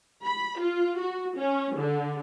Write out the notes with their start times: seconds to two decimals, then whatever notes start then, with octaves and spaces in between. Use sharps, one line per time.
0.24 B5
0.58 F4
0.98 F#4
1.37 C#4
1.77 D3